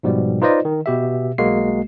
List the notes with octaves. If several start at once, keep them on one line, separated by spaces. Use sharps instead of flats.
G#2 B2 F3 G3
D#4 F4 B4 C5 D5 D#5
D#3
B2 G4 E5
B1 G#3 A#3 F#4 C7